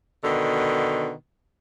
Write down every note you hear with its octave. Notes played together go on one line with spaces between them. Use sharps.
B2 D3 D#3